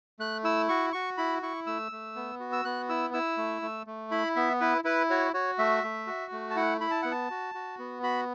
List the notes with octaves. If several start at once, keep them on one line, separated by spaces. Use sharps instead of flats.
A3 F#6
E4 E6
F#4 C#6
F#4 C#6
E4 B5
E4 C#6
A3 E6
A3
B3
F#4
E6
B3 F#6
E4 E6
E4 E6
A3
A3
A3
E4 B5
B3 E5
E4 B4
E4 B4
F#4 C#5
F#4 C#5
A3 E5
A3
F#4
A3
A5
E4 F#5
E4 B5
A5
B3 F#5
A5
F#4
F#4
B3
F#4 B5